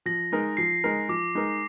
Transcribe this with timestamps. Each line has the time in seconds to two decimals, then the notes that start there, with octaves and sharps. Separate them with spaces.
0.06 F3 A#6
0.32 G#3 D#4 A#4
0.57 F3 C7
0.84 G#3 D#4 A#4
1.09 F3 D6
1.35 G#3 D#4 A#4